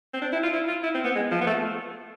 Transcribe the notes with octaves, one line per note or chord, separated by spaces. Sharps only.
C4
D4
E4
F4
E4
F4
E4
C4
B3
G#3
F3
B3
A3